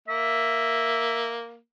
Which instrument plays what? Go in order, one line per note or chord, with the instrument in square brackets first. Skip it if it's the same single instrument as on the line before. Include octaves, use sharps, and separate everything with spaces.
[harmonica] A#3 [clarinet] E5